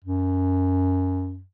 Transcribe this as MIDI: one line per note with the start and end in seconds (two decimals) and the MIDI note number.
0.04 1.43 42